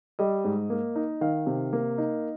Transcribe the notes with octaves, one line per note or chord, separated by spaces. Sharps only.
G3 D#5
G#2
A#3
D#4
D#3 F5
C3
A#3
D#4